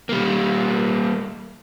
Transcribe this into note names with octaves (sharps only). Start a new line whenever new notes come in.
G3 A#3